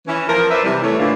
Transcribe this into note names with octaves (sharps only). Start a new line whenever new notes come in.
E3 C#4
F3 A#4
B4 C5 D5 E5
C3 E3 G3
E3 A3 C#5
A2 D3 E3 A#3 D4 F4